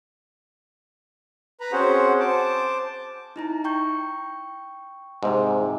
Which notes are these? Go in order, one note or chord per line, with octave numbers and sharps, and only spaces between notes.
B4 A#5 B5
C4 C#4 F#4 G#4 C5 F#5
C5 A5 D6
D#4 E4 A#5
G5 C#6 G6
G#2 C3